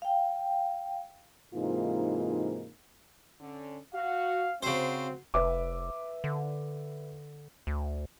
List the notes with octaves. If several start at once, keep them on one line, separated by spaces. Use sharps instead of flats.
F5 G5
G#2 C3 E3 A#3 D#4 F4
D3 C#4
F#4 F5
C#3 C4 F#4 C5
F1 B4 E5 D6
D3
D2